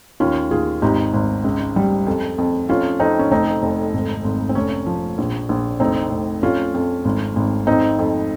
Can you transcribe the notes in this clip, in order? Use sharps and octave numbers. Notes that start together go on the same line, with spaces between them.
D#2 C#4 F4
D#2 F4 G#4
G#1 D#4 G4
G#1
C#2
G3
F2
F2
F2 C#4 F4
F2 C4 D#4
C#4
F1 C4 D#4
F1
G#1
G#1
C4
F1 C#4
F3
A#1
A#1
F1 C4 D#4
F1
F2 C#4 F4
F2
G#1
G#1
F2 C4 D#4
F2